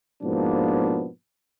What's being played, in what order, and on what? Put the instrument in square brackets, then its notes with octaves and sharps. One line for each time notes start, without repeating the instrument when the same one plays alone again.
[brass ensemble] G#2 B2 F3 A#3 B3 D4